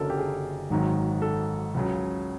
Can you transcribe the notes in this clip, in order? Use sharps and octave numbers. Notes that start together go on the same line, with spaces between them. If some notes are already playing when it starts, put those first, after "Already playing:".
Already playing: F#1 F#2 D3 F#3 A4 A#4
G4
G#4
G#1 G#2 D#3 F#3
A4
C#2 C#3 F#3